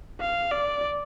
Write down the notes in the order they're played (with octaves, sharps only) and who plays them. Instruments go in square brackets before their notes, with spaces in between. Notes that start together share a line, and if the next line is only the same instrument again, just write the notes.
[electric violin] F5
D5